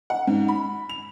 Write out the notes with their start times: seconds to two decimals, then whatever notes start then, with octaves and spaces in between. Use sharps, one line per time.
0.10 F#5
0.27 G#2
0.48 B5
0.89 F7